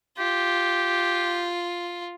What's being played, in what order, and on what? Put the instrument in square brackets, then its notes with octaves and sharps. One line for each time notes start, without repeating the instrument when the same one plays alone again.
[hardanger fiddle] F4 [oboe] G4